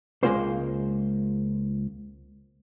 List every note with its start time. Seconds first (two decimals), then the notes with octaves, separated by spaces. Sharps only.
0.23 C#2 G#2 G#3 A#3 F4 C5